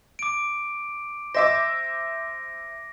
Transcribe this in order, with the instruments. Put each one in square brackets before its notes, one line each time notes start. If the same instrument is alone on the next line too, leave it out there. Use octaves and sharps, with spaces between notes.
[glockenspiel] D6 D7
[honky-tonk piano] C5 E5 D6 [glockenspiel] A#6